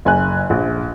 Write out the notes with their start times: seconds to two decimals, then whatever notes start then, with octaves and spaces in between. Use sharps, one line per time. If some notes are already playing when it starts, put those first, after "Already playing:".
0.05 F#1 G#5 F#6
0.50 A#1